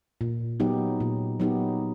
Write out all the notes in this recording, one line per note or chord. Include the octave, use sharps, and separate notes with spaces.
A#2
F#3 B3 D#4 G4
A#2
F#3 B3 D#4 G4